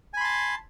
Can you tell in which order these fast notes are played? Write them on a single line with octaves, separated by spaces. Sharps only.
G#5 B5 C6 A5